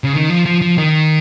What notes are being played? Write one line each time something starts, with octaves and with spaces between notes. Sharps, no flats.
C#3
D#3
F3
F3
F3
D#3